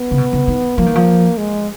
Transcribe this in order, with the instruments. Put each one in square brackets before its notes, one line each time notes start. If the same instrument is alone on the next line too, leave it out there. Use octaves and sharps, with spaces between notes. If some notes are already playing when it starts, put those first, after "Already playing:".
Already playing: [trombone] B3
[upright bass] C#3
B2
C#3
D#3
[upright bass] F3 [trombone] A#3
[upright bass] D#3
F3
[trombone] G#3